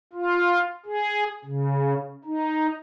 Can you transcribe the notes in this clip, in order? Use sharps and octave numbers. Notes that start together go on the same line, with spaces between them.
F4
G#4
C#3
D#4